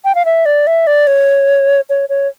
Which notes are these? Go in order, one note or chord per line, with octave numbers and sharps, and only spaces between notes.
G5
F5
E5
D5
E5
D5
C#5
C#5
C#5